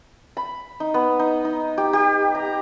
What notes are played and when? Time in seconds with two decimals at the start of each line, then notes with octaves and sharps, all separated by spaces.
0.37 B5
0.80 D#4
0.94 B3
1.19 D#4
1.45 D#4
1.78 G4
1.93 G4
2.35 A#5